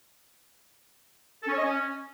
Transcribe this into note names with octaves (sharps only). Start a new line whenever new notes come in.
A4
C#4
C#5
D#5
C#4